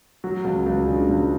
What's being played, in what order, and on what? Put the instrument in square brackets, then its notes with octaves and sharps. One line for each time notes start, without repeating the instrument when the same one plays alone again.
[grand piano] F#3 F#4
C#2
C#2
C#3 D4
C#2